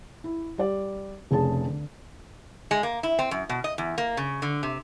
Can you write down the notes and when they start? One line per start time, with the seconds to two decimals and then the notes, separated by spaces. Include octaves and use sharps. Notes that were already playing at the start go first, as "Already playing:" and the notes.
0.24 E4
0.58 G3 D5
1.31 F1 C#3 G#4 A5
1.65 D3
2.71 G#3
2.83 A#3
3.03 E4
3.19 C4
3.31 F#2
3.49 B2
3.64 D#5
3.78 E2
3.98 A#3
4.17 C#3
4.42 D3
4.63 C3